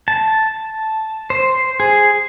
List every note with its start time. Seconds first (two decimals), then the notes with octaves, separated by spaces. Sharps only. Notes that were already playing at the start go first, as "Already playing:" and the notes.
0.08 A5
1.30 C5
1.80 G#4